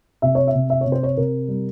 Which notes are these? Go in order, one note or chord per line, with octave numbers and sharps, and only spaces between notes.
C3 E5
C#5
E5
C3
E5
C3 C#5
C5
C#5
C3 A#4
G3